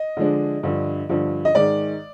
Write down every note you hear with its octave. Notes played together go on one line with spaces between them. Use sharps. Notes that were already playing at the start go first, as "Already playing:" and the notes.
Already playing: D#5
D3 F3 G#3 D4
G2 D3 F3
G2 D3 F3
D#5
G#2 D#3 G#3 D5